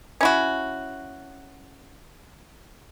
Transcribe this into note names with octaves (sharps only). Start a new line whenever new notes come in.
C#4 E4 F#4